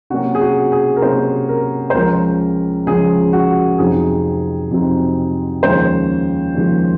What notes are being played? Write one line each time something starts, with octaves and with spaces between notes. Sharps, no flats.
C3 F#3 A#3 C#4 F#4
G#4
F#4
G#4
A#4
C3 F#3 A#3 C#4 C5
A#4
C5
C#2 C#3 F3 G#3 C#4 A#4
C#2 C#3 F3 G#3 C#4 G#4
F#4
F2 C3 F#3 C4 D#4 G#4
F2 C3 F#3 C4 D#4
D#2 C#3 F3 G#3 C#4 C5
D#2 C#3 F3 G#3 C#4